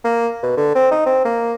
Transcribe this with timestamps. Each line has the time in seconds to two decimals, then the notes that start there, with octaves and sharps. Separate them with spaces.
0.04 A#3
0.43 B2
0.57 D3
0.75 C4
0.91 D#4
1.06 C4
1.25 A#3